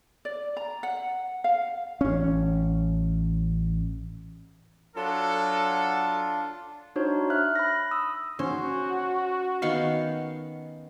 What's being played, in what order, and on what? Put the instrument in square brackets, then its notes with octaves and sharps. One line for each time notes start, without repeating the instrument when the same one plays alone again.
[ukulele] D5
A#5
F#5
F5
[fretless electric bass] A1 C#4
[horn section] F#3 A4 [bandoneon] D4 F4
[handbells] D4 D#4 F#4 C5 C#5
E5 F6 F#6
B5 A#6
D#6 E6
[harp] C#4 [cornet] F#4 [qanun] C5
[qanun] D#3 B3 F5 [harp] C#7